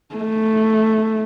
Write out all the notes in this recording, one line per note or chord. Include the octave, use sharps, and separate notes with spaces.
A3